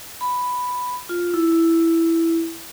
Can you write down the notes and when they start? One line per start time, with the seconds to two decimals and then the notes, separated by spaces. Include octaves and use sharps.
0.21 B5
1.09 F4
1.34 E4
1.52 E4